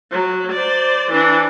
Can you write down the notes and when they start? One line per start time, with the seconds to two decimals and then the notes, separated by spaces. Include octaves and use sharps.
0.11 F#3
0.52 C5 D5
1.11 E3 D4